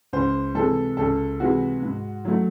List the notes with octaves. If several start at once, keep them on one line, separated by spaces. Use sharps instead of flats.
C#2 C5
C3 E3 G#3 A4
C#2 A4
C3 E3 G#3 F#4
G#2
F#3 A3